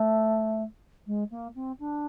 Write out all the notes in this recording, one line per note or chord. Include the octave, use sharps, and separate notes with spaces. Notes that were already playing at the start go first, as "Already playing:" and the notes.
Already playing: A3
G#3
A#3
C4
D4